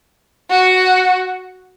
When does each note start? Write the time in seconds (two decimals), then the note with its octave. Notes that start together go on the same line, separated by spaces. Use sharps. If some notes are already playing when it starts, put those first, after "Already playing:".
0.50 F#4